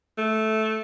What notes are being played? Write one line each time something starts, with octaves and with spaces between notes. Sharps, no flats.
A3